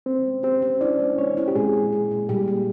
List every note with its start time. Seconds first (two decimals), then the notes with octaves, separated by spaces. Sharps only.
0.06 C4 C#4 C5
0.26 G#3
0.43 C4 G4 C5
0.62 C#4
0.81 D4 E4 D5
0.99 G#3
1.18 G#3 C#4 C#5
1.37 E4
1.48 G4
1.55 A#2 G#3 G#4
1.73 A#2
1.93 A#2
2.11 A#2
2.29 A#2 G3 G4
2.48 A#3